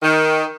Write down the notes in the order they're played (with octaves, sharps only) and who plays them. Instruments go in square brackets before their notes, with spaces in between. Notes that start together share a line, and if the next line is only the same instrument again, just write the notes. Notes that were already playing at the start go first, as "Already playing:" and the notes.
[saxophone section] D#3